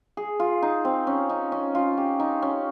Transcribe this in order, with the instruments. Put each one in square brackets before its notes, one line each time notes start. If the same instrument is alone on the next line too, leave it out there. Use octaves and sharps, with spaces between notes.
[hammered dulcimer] G#4
F4
D#4
C4
C#4
D#4
C#4
F4
G4
D#4
C#4